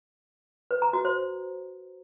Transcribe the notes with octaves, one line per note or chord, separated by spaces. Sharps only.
B4
A#5
F#4
C5